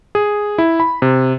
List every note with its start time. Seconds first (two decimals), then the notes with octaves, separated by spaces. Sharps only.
0.15 G#4
0.58 E4
0.80 B5
1.02 C3